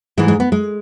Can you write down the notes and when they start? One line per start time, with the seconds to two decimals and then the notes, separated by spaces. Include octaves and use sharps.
0.18 G#2 E3 G#3
0.28 G#3
0.40 B3
0.52 G#3